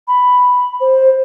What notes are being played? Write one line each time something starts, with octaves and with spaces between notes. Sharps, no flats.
B5
C5